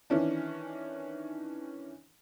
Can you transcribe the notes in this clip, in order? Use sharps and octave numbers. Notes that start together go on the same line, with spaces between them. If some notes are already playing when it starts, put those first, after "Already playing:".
D#3 E3 C#4 D4